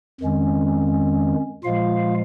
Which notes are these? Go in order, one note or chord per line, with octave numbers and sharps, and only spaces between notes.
F2 D#3 G#3 C#4
A#2 F3 G#3 F4 F5